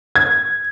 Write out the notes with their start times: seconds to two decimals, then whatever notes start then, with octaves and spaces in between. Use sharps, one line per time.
0.16 G#6